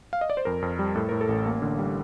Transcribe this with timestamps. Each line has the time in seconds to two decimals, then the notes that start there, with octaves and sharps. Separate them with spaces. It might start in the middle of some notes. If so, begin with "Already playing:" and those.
0.13 F5
0.21 D#5
0.30 D5
0.37 C5
0.45 F2 A#4
0.62 F2
0.79 G3
0.95 A2 A4
1.09 A2 A#4
1.21 A4
1.29 A1
1.46 A#3
1.62 D3
1.79 G3